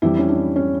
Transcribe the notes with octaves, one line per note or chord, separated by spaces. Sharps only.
F2 E3 G3 E4
C#4
D4
C#4